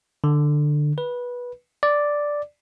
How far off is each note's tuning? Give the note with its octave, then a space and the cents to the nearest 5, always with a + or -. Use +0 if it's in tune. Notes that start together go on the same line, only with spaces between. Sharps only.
D3 +15
B4 -15
D5 +0